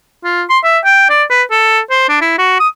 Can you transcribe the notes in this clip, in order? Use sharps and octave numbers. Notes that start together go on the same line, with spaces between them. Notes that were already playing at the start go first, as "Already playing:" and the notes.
F4
C6
E5
G5
D5
B4
A4
C5
D4
E4
F#4
D#6